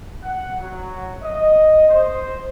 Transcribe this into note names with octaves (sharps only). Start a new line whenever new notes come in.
F#5
F#3
D#5
C5